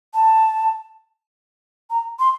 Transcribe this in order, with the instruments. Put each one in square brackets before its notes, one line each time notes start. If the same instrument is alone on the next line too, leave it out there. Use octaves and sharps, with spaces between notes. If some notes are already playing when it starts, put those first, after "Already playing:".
[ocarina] A5
A#5
C6